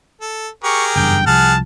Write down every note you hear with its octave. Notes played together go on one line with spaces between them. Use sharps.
A4
G4 G#4 A#4 C#6
F#1 E2 G2 G5
C2 F3 G#4 F#5 A5 F6